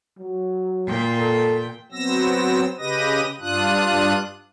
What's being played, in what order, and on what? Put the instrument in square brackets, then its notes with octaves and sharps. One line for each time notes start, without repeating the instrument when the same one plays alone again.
[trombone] F#3
[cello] A#2 G5
[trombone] A4
[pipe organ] F#3 B3 C4 E6 A#6
C#3 G4 B4 D#5 D#6 A#6
G2 D4 F4 D#6 F#6